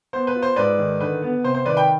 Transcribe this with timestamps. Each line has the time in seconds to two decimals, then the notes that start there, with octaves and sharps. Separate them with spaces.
0.13 B3 C5
0.27 B4
0.35 F4
0.42 C5
0.56 G#2 B4 D5
0.79 D#3
1.00 D3 B4
1.22 B3
1.44 C3 C5
1.54 C5
1.65 D#3 B4 D5
1.77 G5 B5